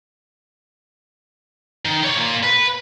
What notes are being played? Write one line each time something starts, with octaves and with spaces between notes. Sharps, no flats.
D#3
C#5 D5
A#3 F4
B4